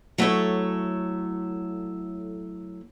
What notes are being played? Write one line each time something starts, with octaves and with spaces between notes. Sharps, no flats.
F#3 A3 E4 A4 C#5